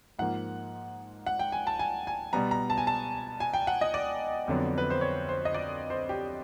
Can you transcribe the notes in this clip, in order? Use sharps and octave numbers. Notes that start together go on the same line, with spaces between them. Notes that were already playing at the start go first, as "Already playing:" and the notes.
G#2 F3 A#3 F#5
F#5
G5
G#5
A5
G#5
G#5
B2 G3 B3 A#5
A#5
A5
G#5
A5
G#5
G5
F#5
D#5
D5
F2 D3 F#3 B3
B4
C5
C#5
C5
D#5
D5
C5
G4